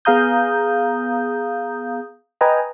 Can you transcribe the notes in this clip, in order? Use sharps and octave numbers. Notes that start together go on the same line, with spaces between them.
B3 G#4 F5 A#5 D#6 G6
B4 D#5 G5 G#5 A#5